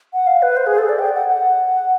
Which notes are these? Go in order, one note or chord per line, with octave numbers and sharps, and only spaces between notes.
F#5
F5
B4
C5
G#4
A4
D5
G5
F#5
F#5